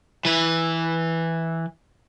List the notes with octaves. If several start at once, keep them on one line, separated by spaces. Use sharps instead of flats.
E3 B4